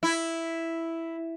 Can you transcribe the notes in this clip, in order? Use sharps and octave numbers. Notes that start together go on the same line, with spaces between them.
E4